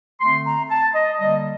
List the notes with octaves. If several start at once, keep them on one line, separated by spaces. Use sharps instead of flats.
D3 A3 C4 C6
A#5
A5
D#5
D3 G3 A#3 D#5